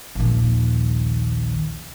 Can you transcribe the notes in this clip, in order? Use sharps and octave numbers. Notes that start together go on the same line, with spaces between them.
A#1 D#2